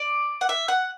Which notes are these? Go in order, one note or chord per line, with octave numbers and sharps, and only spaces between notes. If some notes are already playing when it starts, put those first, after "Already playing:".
Already playing: D5
F#5
E5
F#5